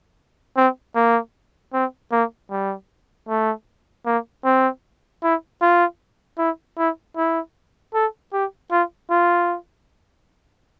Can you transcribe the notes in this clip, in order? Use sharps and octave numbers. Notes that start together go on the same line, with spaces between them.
C4
A#3
C4
A#3
G3
A3
A#3
C4
E4
F4
E4
E4
E4
A4
G4
F4
F4